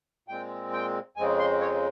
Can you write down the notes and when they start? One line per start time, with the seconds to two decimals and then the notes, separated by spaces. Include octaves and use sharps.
0.28 A#2 G#3 C4 G5
0.73 G5
1.17 F2 C#3 G#3 C4 G#5
1.39 C6
1.61 C#5